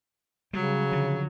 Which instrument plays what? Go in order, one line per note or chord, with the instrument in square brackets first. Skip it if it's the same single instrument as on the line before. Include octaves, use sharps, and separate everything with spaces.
[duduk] C#3 [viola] F#3 [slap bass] G3
[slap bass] D3 F3